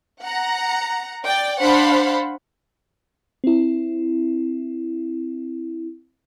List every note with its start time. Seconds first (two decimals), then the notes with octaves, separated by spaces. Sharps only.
0.22 F#5 A#5
1.25 D5 G5
1.61 D4 C5 F5 F#5 B5 C6
3.44 C4 E4